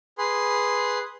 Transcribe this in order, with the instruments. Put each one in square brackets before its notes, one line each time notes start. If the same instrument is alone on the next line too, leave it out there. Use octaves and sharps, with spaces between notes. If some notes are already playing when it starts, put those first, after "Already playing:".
[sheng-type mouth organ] G#4 B4 C6